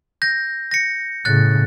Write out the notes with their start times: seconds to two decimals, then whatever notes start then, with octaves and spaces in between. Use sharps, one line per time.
0.22 G6 A#6
0.71 A#6 C#7
1.25 A2 C#3 F#6 A6